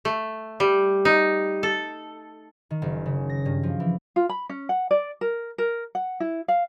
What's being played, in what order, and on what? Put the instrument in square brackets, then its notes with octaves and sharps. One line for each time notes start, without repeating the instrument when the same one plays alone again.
[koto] A3
G3
D#4
A4
[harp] D#3
F#1
C#3
A#6
G2
F3
E3
[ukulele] F4
B5
C#4
F#5
D5
A#4
A#4
F#5
E4
F5